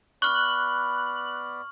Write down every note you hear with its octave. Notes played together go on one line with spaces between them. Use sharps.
B3 D5 B5 C#6 F6 F#6 F#7